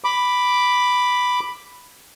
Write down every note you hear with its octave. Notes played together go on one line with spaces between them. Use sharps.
B5 D6